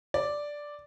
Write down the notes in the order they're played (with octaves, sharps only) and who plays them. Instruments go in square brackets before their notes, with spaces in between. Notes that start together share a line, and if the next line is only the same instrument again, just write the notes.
[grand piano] D5